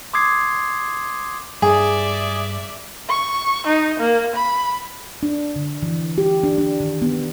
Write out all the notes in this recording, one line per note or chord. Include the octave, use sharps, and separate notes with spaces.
C6 D6 D#6 G#6 C7
G2 G#4 D5 E5
C#6
D#4
A#3
B5
D4
D3
E3
G4
D4
D4
D#3
B3